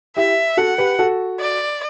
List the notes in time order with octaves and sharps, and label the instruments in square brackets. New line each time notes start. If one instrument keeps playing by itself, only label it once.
[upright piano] E4 G4 [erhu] E5
[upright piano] F#4 A4 [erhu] F#5
[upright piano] G4 B4
F#4 A4
[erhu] D5